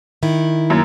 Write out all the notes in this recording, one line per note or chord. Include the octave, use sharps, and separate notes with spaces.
D#3 E4
F#2 A#3